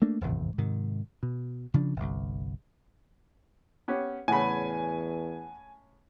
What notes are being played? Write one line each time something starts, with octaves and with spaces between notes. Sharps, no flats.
A3 A#3 D4
D1 G#1 E2 C3
G#2 C3 D#3
B2
C#3 F3 D4
G1 C2
B3 C#4 G4
E2 A2 C#3 F#5 G#5 B5